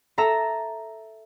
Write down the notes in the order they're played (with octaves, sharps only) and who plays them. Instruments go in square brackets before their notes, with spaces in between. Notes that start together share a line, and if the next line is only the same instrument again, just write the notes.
[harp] A4 E5 A#5